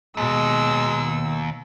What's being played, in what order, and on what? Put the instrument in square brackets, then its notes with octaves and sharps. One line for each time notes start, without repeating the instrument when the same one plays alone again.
[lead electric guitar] D#2 [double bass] B2 [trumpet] G#3 [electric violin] E6